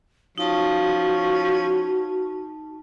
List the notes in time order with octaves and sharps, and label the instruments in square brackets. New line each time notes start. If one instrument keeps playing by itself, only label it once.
[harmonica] F3 C#4 [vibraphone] D#4 A5 [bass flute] F#4